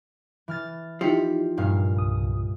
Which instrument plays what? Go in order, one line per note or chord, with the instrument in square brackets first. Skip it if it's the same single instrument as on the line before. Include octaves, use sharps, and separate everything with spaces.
[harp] E3 F6 A6
[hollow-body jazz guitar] F3 [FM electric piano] D#4 E4 G4 [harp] B6 C#7
[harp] G2 A#2 F5
[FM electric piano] C2 D#6